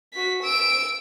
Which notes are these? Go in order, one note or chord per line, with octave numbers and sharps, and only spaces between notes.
F#4 B6
E6 D7